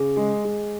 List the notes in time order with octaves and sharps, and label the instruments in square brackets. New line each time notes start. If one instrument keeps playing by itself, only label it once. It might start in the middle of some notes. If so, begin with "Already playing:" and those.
Already playing: [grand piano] C#3 [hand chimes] G#4
[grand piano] G#3
G#3